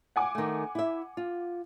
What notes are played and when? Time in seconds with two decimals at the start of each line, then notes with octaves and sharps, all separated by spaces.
0.16 F#5 G#5 D6
0.35 D#3 A3
0.75 E4 E5
1.17 F4